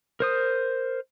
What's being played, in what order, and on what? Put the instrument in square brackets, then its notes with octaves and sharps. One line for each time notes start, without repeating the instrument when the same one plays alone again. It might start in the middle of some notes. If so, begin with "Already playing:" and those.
[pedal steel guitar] A#4 C5 D#6